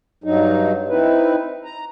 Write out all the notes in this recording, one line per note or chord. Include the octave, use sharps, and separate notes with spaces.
G2 F#3 D#4
C4 D#4 E4 B4
A#5